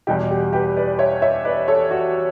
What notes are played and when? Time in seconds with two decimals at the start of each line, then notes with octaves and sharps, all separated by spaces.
0.07 E2 B2 G3 G4
0.31 G4
0.53 G4 B4
0.77 B4 D5
0.99 C#5 E5
1.22 C#5 E5
1.45 B4 D5
1.68 A4 C#5
1.91 F#4